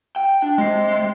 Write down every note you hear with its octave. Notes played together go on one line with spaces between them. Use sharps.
G5
D4
C3 G#3 C7